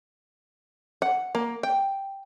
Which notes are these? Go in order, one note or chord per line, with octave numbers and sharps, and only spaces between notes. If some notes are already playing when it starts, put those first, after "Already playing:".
F#5
A#3
G5